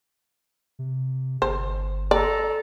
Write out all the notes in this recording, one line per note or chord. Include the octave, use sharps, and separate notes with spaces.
C3
G1 C5
A4 D5 A#5